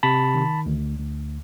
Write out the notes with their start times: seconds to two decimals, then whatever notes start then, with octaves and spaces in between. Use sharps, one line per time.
0.03 C3 A5 B5
0.35 D#3
0.66 D2
0.98 D2